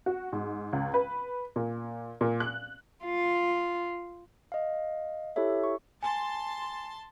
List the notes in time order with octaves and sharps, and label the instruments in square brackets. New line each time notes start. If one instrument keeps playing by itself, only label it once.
[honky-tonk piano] F#4
G#2
C#2
B4
A#2
A#2
F#6
[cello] F4
[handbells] D#5 F5
E4 G4 A4 C#5 E5
C#6
[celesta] G#5 [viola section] A5 C6